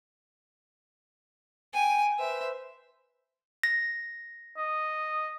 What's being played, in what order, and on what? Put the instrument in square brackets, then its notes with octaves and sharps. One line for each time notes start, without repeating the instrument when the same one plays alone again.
[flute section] G5 [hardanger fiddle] G#5
[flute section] B4 C5 [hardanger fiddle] E5
[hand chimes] A#6
[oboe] D#5